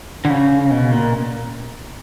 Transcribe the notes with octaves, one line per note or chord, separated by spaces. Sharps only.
D3
C#3
B2
A#2